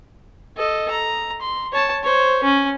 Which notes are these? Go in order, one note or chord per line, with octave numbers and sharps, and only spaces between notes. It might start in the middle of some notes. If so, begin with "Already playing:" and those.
A4 D#5
A#5
C6
C#5 A5
C5 C#5
C#4